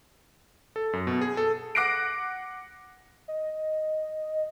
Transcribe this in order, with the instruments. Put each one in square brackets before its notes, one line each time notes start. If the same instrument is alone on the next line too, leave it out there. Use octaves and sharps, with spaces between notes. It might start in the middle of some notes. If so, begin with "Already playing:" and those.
[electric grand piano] A4
F#2
B2
G#4
A4
[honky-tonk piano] F#5 D6 F#6 A#6 C7 D7
[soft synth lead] D#5